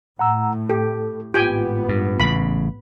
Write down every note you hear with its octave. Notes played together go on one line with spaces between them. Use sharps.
A2 F#5 A#5 E6
G4 A4
G#1 A2 B3 F4 G4 G5 G#5
G2
A1 C#3 B5